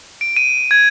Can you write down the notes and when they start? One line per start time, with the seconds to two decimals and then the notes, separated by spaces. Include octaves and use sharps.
0.21 D7
0.37 D#7
0.71 G#6